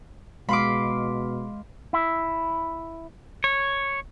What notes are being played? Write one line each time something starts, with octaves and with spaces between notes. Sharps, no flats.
B2 G#3 F5 B5 C6 D6
E4
C#5